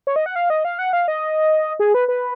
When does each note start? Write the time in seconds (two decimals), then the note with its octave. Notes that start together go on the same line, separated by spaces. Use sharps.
0.07 C#5
0.16 D#5
0.26 F#5
0.36 F5
0.50 D#5
0.65 F5
0.79 F#5
0.93 F5
1.08 D#5
1.80 G#4
1.94 B4
2.08 B4